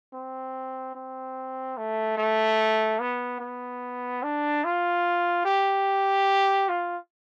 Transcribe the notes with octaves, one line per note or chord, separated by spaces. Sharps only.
C4
C4
A3
A3
B3
B3
D4
F4
G4
F4